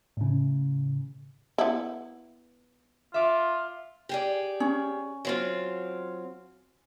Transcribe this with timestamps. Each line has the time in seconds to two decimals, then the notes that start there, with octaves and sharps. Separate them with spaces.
0.17 A2 C#3
1.58 B3 E4
3.14 F4 E5 D6
4.09 G4 G#4 D5
4.60 C#4
5.25 F#3 C4 F4